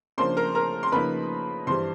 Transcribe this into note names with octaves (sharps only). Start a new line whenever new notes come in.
C#3 F3 A#3 D4 C5 C6
A#4 A#5
A#4 A#5
C6
C#3 F3 A#3 D#4 B4 B5
G2 E3 G3 C5 C6